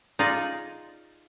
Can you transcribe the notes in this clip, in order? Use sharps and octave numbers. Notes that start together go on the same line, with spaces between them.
D#4 F4 G#4 D5